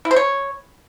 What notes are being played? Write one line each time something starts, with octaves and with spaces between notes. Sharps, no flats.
E4
C5
C#5